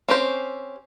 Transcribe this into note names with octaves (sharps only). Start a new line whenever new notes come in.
C4 C#4 G4 C5